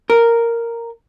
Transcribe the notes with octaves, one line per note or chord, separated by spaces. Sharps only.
A#4